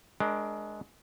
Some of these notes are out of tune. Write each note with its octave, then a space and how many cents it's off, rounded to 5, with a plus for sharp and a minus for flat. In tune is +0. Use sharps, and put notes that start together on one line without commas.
G#3 +20 D4 +5 A#4 +15